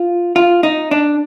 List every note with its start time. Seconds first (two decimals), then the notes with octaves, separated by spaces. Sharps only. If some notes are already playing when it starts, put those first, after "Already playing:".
Already playing: F4
0.36 F4
0.63 D#4
0.91 D4